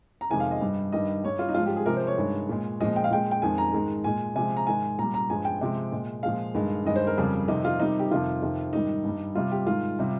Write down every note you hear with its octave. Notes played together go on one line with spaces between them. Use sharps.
A#5
F2 C3 D#3 G#3 G#5
F5
D#5
G2 G3
G2 D#3 G3 D#5
G2 G3 C#5
F4
D#4
G#2 F3 G#3 F4
G4
G#4
C3 F3 G#3 A#4
C5
C#5
G2 D#3 G#3
A#2 G#3
A#2 F3 G#3 D#5
G5
F5
A#2 G#3 G5
G5
F2 D#3 G#3 G#5
A#5
G#2 D#3 G#3
A#2 G#3 G#5
C3 F3 G#3 G#5
A#5
G#2 D#3 G#3 G#5
A#2 G3 A#5
A#5
G2 F3 G#3 G#5
G5
C3 F3 G#3
A#2 G#3
A#2 F3 G#3 F5
G2 D#3 G#3
G2 D#3 G#3 D#5
C5
A#4
F2 C#3 G3
F2 C3 D#3 D#4
F4
C3 D#3 G3 D#4
G4
F2 C3 D#3 F4
F2 C3 D#3
G#2 D#3 G3 D#4
G2 G3
C3 G3 F4
G4
G#2 D#3 G#3 F4
C3 G3